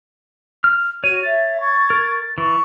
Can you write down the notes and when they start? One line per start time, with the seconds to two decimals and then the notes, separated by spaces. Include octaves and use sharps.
0.64 F6
1.04 F#4 C#5 F6 D#7
1.23 E5 A6
1.59 C#6 G#6
1.90 A#4
2.38 E3 C#6